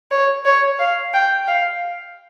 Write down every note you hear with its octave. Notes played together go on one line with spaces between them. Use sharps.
C#5
C#5
F5
G5
F5